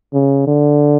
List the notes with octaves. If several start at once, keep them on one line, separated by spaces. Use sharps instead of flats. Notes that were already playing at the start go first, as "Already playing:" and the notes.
C#3
D3